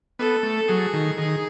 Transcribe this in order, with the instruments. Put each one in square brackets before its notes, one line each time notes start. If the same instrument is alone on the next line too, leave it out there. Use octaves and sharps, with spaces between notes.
[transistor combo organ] B3 [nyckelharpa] A4
[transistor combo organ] A3
[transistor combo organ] F#3 [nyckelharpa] G#4
[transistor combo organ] D#3
[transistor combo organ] D#3 [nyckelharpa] G#4